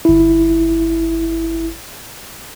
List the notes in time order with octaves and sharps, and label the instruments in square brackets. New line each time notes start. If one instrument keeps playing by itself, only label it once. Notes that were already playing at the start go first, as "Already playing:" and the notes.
[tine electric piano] G1 E4